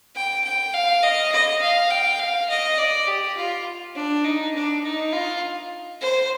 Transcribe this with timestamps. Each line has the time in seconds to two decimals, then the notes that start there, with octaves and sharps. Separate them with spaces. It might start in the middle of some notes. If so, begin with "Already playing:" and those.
0.16 G5
0.45 G5
0.74 F5
1.03 D#5
1.32 D#5
1.61 F5
1.90 G5
2.19 F5
2.50 D#5
2.78 D5
3.07 G4
3.37 F4
3.96 D4
4.25 D#4
4.55 D4
4.84 D#4
5.12 F4
6.01 C5